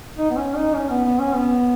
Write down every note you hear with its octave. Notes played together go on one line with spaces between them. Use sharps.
D#4
B3
C#4
D#4
C#4
B3
B3
C#4
B3